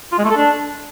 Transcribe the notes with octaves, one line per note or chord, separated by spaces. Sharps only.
F4
G#3
A3
A4
D4